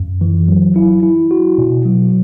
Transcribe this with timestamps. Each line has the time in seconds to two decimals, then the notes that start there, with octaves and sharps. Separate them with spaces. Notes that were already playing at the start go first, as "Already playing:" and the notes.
Already playing: F#2
0.21 E3
0.48 F#3
0.76 E4
1.03 E4
1.31 F#4
1.58 B2
1.85 F#3